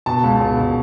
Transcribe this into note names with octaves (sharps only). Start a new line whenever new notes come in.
B2 A5
C#2
B2
B2